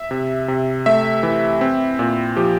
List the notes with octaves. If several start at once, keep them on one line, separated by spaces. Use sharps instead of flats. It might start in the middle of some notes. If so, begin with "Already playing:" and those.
Already playing: E5
C3
C3
A3 E5
E3
C4
A#2
F3 G4